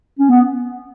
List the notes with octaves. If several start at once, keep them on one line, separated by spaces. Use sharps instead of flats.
C#4
B3